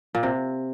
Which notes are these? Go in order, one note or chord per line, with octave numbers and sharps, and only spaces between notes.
A#2
C3